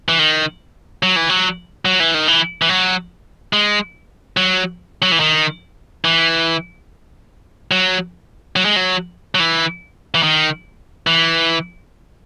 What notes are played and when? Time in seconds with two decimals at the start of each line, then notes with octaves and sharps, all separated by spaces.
0.09 E3
0.19 D#3
1.03 F#3
1.16 E3
1.29 F#3
1.85 F#3
2.00 E3
2.14 D#3
2.28 E3
2.62 E3
2.69 F#3
3.53 G#3
4.37 F#3
5.02 F#3
5.12 E3
5.20 D#3
6.05 E3
7.71 F#3
8.56 F#3
8.65 G#3
8.76 F#3
9.35 F#3
9.40 E3
10.15 E3
10.23 D#3
11.07 E3